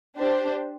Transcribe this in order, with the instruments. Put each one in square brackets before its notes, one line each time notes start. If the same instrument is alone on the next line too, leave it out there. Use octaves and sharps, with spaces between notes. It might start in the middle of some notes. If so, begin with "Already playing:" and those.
[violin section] D4 G4 C5